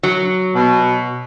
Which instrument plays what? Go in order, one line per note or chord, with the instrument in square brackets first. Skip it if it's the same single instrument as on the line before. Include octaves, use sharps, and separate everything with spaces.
[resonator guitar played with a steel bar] F#3
[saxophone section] B2